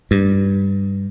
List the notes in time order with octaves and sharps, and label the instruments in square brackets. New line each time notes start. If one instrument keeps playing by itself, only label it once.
[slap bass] G2